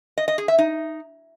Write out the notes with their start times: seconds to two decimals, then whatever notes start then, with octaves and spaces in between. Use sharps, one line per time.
0.18 D#5
0.28 D#5
0.38 G#4
0.48 E5
0.58 D#4